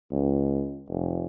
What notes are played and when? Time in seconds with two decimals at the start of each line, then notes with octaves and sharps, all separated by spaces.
0.12 C#2
0.89 F1